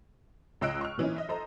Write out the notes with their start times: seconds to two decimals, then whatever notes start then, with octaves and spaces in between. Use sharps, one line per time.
0.61 C#2 C#5 D#5 E6 F#6 D7
0.81 C#6 F6
0.98 A#2 E3 C#4 D#4
1.16 D#5 E5
1.29 A4 C5 D#5 A#5